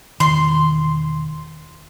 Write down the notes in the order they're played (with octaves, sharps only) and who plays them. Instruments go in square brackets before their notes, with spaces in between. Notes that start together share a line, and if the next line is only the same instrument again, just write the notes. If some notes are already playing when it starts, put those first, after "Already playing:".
[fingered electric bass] E1 D#3 [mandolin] C6